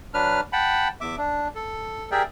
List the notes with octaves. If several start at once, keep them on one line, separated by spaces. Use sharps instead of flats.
F#3 D4 B4 F6
F#5 G5 A5 B5
E2 E5 D6
D4
A4
G4 G#4 A#4 D5 E5 G5